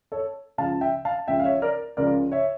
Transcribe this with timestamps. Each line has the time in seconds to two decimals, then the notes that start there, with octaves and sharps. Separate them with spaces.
0.12 A4 C#5
0.58 C#2 C#3 F3 F5 A5
0.81 E5 G5
1.05 F5 A5
1.27 C#2 C#3 F3 E5 G5
1.40 F5
1.45 C#5 E5
1.62 A#4 D5
1.97 C#2 C#3 F3 A#4 D5
2.32 C#5 E5